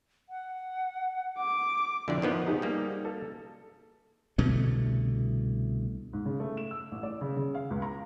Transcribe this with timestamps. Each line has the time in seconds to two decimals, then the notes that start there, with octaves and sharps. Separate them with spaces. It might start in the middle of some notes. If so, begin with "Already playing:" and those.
0.29 F#5
1.38 D6
2.08 F2 A2 D3 D4 D5
2.22 D#3 F3 B3
2.46 D#4 G4 G#4
2.62 G3 A#3
3.05 A4
4.38 C2 B2 D3 A3
6.13 G#2
6.25 C#3
6.40 A3
6.57 E7
6.71 E6
6.91 A1
7.03 D5
7.21 C#3
7.37 C#3
7.55 F5
7.70 C#2
7.82 A#5